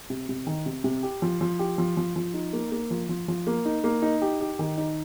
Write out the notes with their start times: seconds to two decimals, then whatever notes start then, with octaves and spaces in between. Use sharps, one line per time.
0.10 C3
0.29 C3
0.47 D#3
0.66 C3
0.84 C3
1.03 G4
1.22 F3
1.41 F3
1.59 G4
1.78 F3
1.97 F3
2.16 F3
2.34 D#4
2.53 A#3
2.72 A#3
2.91 F3
3.09 F3
3.28 F3
3.47 A#3
3.65 D#4
3.84 A#3
4.02 D#4
4.22 G4
4.40 G4
4.59 D#3
4.78 D#4